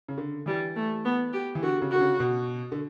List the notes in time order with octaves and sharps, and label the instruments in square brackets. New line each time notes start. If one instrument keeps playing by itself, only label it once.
[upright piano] C#3
D3
[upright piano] E3 [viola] G3
[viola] A3
B3
G4
[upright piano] E3
[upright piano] D3 [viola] F#4
[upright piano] C#3
[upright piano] D3 [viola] F#4
[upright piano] C#3
B2
D3